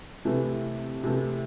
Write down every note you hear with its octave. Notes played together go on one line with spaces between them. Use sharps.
C3 E3 A3
C3 E3 A3